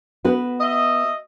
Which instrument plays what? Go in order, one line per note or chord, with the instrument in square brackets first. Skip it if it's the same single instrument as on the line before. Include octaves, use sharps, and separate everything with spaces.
[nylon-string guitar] B3 F#4 B4
[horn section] D#5 E5